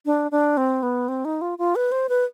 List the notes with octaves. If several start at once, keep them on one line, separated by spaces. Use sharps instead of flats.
D4
D4
C4
B3
C4
D#4
F4
F4
B4
C5
B4